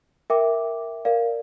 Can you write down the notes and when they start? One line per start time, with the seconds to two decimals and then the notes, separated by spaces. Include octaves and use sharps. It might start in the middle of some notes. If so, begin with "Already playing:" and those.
0.30 A#4 E5 G5 D6
1.05 A#4 D5 F5